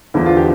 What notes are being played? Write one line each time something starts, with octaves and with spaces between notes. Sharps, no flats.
E2 D3 F3 E4
F4
G4